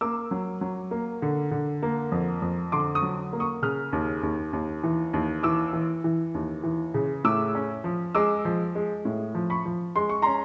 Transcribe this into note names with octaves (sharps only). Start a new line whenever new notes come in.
A#3 D6 E6
F#3
F#3
A#3
D3
D3
A#3
F2
F2
D3 C6 D6
C#6 D#6
F#3
A#3
C#6 D#6
C#3 D#6 F6
D#2
D#2
D#2
E3
D#2
E3 D6 E6
E3
E3
D#2
E3
C#3
A2 D6 E6
C#4
F3
G#3 D6 E6
F3
G#3
A2
F3
B5 C#6
F3
G#3 C6
C#6
C#4 A#5 C6